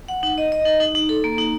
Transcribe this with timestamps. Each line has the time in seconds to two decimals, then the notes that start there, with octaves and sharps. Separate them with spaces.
0.08 F#5
0.23 D#4
0.38 D#5
0.52 D#5
0.66 D#4
0.80 D#4
0.95 D#4
1.09 A4
1.24 A#3
1.38 D#4